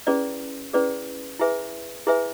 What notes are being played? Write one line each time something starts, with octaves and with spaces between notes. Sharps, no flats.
C#4 E4 G#4 B4 D5
C#4 E4 G#4 B4 D5
E4 G#4 B4 E5 G#5
E4 G#4 B4 E5 G#5